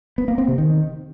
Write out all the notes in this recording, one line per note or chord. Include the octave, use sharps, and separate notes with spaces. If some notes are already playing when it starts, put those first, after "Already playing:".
B3
A#3
C4
C3
D#3